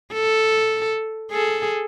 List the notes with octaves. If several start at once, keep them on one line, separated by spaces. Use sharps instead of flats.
A4
G#4 A4